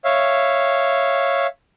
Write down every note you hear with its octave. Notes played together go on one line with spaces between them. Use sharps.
C#5 E5 F5